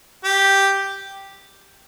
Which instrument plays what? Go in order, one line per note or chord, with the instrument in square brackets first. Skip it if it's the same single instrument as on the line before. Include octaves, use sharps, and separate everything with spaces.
[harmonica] G4